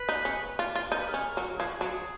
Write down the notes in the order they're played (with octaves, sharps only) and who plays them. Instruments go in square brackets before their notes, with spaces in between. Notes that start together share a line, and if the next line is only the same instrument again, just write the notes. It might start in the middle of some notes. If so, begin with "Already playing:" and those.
Already playing: [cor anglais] B4
[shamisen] D#4
C#4
F4
F4
[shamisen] D#4 [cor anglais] A#4
[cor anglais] B4
A#4
[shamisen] C#4
F#3
[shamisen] F3 [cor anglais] G#4
[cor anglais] F#4
G#4
[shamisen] F#3